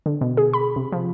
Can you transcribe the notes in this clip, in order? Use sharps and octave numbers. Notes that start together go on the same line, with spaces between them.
D3
B2
G#4
B5
C3
F3